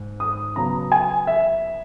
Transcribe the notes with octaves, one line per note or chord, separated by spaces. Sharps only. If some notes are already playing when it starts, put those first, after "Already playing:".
Already playing: G#2
D#6
C#3 F#3 B3 A#5
G#5
E5